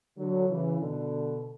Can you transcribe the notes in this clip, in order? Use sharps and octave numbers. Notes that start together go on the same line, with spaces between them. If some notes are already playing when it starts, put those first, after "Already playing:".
D3 F#3
C#3 E3
B2 D3